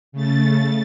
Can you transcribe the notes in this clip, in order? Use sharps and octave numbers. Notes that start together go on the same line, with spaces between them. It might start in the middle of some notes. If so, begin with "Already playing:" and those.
C#3 A3 A6